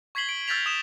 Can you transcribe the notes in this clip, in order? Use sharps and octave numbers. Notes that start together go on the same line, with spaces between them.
C#6 G#6 B6 C7 F#7 G7
D7
E6 F6 G6 A6 B6 F7
D#6 E7